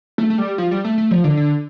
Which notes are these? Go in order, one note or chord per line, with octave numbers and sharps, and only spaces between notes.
A3
A3
G3
F3
G3
A3
A3
F3
D3
D3